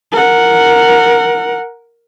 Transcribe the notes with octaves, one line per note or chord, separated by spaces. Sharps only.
A#4 F#5